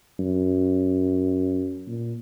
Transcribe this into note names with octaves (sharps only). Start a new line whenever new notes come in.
F#2
A#2